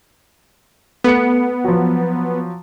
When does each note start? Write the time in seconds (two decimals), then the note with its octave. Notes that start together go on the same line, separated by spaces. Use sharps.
1.04 A3 B3 C#7
1.64 F3 F#3